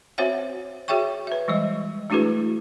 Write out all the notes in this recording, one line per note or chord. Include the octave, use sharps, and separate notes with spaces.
C4 F#4 C5 C#5 E5 F#5
F#4 G#4 C#5 E5 G5 C#6
B4 E5
E3 G3 G#3 D#5
A3 D4 E4 F#4 G#4 B4